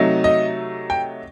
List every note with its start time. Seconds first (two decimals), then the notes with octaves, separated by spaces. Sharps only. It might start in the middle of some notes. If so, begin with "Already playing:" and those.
Already playing: C3 F#3 A3 D#4
0.24 D#5
0.90 G5